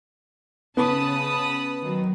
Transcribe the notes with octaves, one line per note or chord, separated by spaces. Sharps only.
C#3 B3 A5 B5 D#6
D#3 F#3